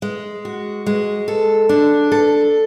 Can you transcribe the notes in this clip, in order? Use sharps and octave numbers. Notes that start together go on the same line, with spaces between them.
G#3
F#4
G#3
A4
D4
A4